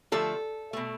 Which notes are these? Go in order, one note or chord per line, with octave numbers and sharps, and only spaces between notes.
D3 F3 A3 A4
B2 A3